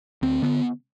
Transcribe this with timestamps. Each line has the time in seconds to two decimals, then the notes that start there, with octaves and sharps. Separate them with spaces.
0.22 D2 C4
0.42 D3 B3